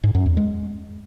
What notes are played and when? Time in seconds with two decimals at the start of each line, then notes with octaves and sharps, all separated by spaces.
0.04 G#2
0.15 F#2
0.26 E2
0.37 G#3